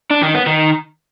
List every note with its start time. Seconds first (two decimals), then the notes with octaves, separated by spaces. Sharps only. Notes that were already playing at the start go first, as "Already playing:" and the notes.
0.10 D4
0.22 D#3
0.34 B3
0.46 D#3